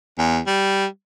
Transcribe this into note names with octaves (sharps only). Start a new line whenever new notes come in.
E2
G3